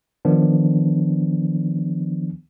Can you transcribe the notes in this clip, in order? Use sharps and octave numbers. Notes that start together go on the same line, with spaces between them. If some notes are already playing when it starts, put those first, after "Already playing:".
D#3 F3 B3 D4